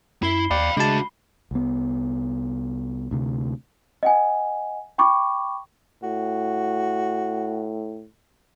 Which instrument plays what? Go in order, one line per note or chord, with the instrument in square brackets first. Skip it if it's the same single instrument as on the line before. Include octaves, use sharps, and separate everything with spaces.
[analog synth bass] F#2 [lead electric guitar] E4 [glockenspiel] B5 C7 G7
[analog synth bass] D#2 [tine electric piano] D5 [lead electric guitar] F5 G5 [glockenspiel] B5
[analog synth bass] C#3 [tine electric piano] G#3 A5 [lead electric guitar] D4 F#4
[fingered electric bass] C2 B3
D2 C3
[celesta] D#5 F#5 G#5
G5 B5 C#6 D6
[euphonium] A2 [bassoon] F#4